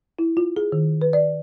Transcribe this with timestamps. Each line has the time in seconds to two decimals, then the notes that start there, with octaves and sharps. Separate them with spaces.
0.19 E4
0.37 F4
0.56 G#4
0.72 D#3
1.02 B4
1.13 D5